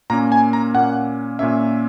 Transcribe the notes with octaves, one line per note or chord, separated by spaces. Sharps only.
A#2 A#3 C#4 A#5
G#5
A#5
A#2 A#3 C#4 F#5
A#2 A#3 C#4 E5